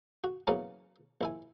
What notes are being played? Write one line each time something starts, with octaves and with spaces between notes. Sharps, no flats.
F#4
C#3 E3 F#3 A#3 B3 C#4
A#1 E4 G#5